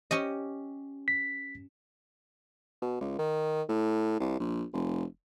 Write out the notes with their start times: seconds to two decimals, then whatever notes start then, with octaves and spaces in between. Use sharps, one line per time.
0.11 C#4 G4 D#5
1.08 B6
2.82 B2
3.01 C#2
3.19 D#3
3.69 A2
4.20 C2
4.40 A#1
4.73 F1